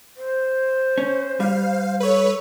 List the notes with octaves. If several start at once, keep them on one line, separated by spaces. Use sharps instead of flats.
C5
C#4
G3 F5
A4 B4 C#5